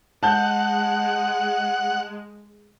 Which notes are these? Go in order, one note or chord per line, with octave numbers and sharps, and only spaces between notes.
G#3 F#5 A5 G6